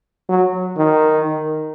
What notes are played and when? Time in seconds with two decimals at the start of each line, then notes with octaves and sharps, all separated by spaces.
0.29 F#3
0.77 D#3